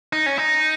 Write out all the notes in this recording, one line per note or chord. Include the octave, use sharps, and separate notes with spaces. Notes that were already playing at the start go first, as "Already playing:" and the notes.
D#4
C#4
D#4